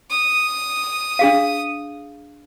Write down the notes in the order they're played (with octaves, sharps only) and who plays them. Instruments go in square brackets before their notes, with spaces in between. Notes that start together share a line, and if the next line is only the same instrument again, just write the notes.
[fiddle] D#6
[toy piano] D4 G#4 F5